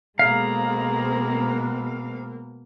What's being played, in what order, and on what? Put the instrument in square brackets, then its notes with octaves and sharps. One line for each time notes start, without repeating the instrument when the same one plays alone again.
[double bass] B2 A#3 [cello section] G#3 C4 [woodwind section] G#4 A4 A#5 [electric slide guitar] F5